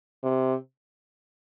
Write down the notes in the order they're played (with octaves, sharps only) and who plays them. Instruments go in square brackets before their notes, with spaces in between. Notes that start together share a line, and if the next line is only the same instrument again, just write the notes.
[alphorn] C3